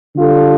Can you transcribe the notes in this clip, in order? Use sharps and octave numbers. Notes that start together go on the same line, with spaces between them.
D3 G3 D4 F4 A4